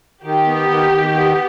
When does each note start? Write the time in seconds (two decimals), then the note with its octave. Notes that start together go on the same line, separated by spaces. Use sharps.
0.24 D#3 G4
0.47 B3
0.69 D#3
0.92 D#3
1.14 B3